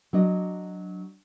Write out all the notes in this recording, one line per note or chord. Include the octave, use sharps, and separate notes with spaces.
F#3 D4 D#5